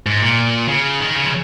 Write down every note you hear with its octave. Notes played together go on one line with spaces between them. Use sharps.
G#2
A#2
C#3
D#3
C#3
F3